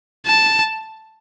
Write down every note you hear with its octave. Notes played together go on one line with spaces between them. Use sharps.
A5